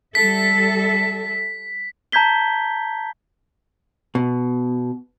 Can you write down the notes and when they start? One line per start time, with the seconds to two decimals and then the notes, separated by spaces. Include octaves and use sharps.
0.15 G3 A4 E5 B6
2.12 A5 A#5 G6 G#6 B6 G7
4.15 B2